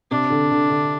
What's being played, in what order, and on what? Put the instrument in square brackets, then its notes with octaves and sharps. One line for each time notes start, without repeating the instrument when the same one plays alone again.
[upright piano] C3 [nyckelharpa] D4
[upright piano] D3
D3
D3